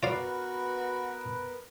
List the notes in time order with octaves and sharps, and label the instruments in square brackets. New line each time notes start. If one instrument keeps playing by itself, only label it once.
[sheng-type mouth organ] B3 A#4 B4 [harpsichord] F4 D5 F5 [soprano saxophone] F#4